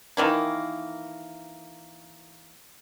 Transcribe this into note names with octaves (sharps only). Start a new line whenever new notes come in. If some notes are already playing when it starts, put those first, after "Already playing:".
D#3 E3 A#3